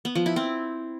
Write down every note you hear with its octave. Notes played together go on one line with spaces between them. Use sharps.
B3
F3
E4
C4